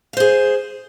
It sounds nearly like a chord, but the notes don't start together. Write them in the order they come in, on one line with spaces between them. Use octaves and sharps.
F5 C5 G#4